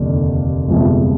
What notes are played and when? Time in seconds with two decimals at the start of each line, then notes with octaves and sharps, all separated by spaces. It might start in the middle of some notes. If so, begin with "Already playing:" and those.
Already playing: F1 D#2 D3
0.68 G1 F2 C3 E3 G#3